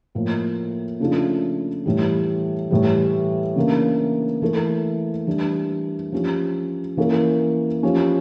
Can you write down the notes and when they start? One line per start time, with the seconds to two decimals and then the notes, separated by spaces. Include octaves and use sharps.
0.15 A2 F3 A#3
1.00 C#3 F3 A3 D4 F4
1.86 A2 E3 G3
2.71 A2 E3 G3
3.56 C#3 E3 A#3 D4
4.42 E3 A3 E4 A#4
5.27 E3 G3 D4
6.12 F3 C#4 G4
6.97 E3 A#3 C#4 E4 A#4
7.83 F3 C#4 G4